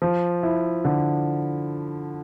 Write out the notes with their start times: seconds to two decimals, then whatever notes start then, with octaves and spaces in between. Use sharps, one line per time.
0.02 F3
0.43 E4
0.85 D3